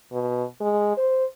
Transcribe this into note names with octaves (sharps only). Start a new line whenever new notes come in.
B2
G#3
C5